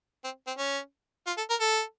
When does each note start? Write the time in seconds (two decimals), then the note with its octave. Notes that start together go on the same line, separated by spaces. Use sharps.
0.24 C4
0.47 C4
0.58 C#4
1.27 F4
1.38 A4
1.50 A#4
1.61 A4